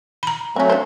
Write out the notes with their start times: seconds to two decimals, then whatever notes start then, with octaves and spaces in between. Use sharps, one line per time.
0.23 A#5 B5
0.56 F#3 A3 C4 C#4
0.70 D4 C5